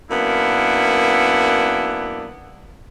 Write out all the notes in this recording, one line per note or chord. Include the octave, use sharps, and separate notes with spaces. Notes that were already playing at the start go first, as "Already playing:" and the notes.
F#2 A#3 B3 D4 E4